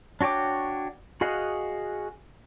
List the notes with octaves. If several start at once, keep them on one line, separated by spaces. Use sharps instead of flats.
D4 F#4 C#5 G5 D6
F#4 G#4 D#5 F5 F#5